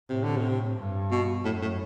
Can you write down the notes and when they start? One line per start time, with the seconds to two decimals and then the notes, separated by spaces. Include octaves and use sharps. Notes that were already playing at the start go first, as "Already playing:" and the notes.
0.09 A2 C3
0.23 D3
0.37 C3
0.78 G2
1.11 B2
1.45 F#2 A2
1.62 A2